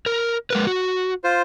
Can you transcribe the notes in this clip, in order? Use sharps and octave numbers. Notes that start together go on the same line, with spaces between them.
A#4
G#3 A#4 B4
F#4
F4 C5